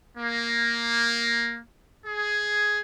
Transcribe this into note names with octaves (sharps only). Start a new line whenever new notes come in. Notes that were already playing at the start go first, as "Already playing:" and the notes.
A#3
G#4